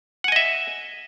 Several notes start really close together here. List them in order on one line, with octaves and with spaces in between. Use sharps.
F#5 G#5 D#5 E5